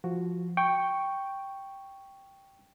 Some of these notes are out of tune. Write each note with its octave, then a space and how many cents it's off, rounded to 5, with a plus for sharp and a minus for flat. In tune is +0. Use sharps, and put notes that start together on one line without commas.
F3 +0 F#4 +0
G5 +0 C#6 +0